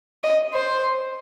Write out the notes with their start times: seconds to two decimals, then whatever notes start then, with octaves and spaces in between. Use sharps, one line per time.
0.24 D#5
0.54 C5